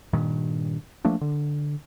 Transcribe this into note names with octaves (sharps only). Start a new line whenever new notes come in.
G2 A#2 D#3
F3 A3 A#3 D4
D3